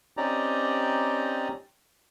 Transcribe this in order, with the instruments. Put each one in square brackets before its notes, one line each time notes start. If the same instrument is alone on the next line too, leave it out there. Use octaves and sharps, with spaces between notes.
[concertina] C4 C#4 D#4 G4 D5 A#5